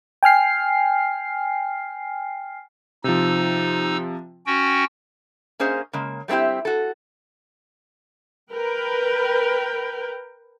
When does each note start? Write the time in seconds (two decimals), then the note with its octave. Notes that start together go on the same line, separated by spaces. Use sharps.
0.23 G5 G#5 F6 C7
3.04 C3 F3 D#4 E6
4.46 C#4 F#4 G5
5.59 A#3 C#4 G#4 C5 D#5 F5
5.93 C#3 G#3 A#3
6.28 G3 A3 C4 E4 G4
6.65 F#4 A4
8.52 A#4 B4 G5